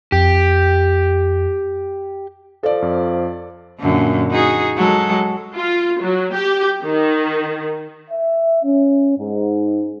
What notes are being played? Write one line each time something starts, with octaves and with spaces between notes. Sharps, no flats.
F2 G4
F3 A4 D5
F2
F#2 A#2 D3
D#4 F#4 G#4
F#3 G#3 A4
F4
F#3
G4
D#3
E5
C#4
G#2